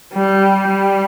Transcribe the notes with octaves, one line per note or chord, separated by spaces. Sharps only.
G3
G3